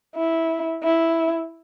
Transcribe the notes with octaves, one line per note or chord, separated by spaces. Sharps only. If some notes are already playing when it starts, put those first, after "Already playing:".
E4
E4